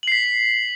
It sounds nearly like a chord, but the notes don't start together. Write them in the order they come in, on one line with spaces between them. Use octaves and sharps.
F#7 C7 B6